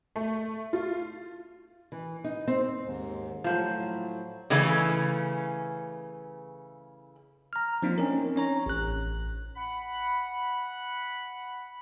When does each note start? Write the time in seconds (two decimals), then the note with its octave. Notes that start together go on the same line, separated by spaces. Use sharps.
0.16 A3
0.73 F4
1.92 E3
2.24 D#4
2.48 C4
2.82 D#2 G#2
3.44 A2 F3 F#3 C5
4.50 C#3 E3 A3 C#4
7.53 A#5 F6
7.82 F3 A#3 C4 D4 D#4 F4
7.98 C4 C#4 D#4 A#4
8.36 C#4 C#5 A#5
8.66 A1 F#6
9.56 F#5 B5